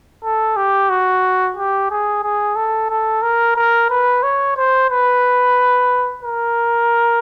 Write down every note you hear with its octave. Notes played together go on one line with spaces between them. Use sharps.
A4
G4
F#4
G4
G#4
G#4
A4
A4
A#4
A#4
B4
C#5
C5
B4
A#4